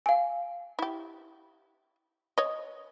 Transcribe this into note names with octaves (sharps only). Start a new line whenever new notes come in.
F5 G#5
E4 G4
C#5 D#5